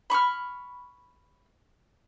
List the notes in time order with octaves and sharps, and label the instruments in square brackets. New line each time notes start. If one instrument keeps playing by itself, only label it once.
[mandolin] B5 C#6 D#6 F6